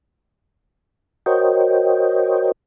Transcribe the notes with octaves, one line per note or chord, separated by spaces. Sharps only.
F#4 A#4 C5 C#5 D#5 G5